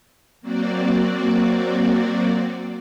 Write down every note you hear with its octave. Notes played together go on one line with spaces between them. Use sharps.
F#3 A#3 C4 F#4 D5